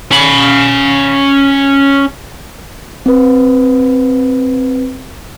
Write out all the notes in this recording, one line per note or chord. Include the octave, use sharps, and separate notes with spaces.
C#4 B5
C4 B4